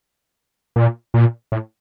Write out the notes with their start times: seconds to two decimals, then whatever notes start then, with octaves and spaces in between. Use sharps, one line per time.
0.76 A#2
1.14 A#2
1.52 A2